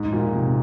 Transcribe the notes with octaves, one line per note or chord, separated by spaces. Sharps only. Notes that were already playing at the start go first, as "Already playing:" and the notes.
Already playing: G#2
A#2
C3